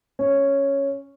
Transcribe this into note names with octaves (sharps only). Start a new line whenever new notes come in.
C#4